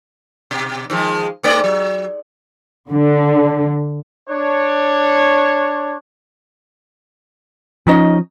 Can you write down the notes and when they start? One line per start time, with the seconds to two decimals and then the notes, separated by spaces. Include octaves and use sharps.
0.51 B2
0.90 D#3 F3 G#3
1.43 G#2 A3 D5
1.64 F#3
2.91 D3
4.29 D4 C#5
7.87 F3 C#4 D#4 D#5